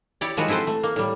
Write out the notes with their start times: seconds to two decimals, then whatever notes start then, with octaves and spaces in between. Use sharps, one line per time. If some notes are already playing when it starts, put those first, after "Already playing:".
0.21 E4 G4 C#5 D5
0.37 D#3 F3 G#3 F#4 B4
0.48 C4 E4 A4 B4 C5
0.67 A3
0.83 A#3
0.96 A2 G3